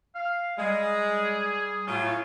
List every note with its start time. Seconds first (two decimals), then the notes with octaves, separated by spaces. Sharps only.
0.15 F5
0.58 G3 G#3 G#4
1.88 A2 F#3 A3 C#4 F4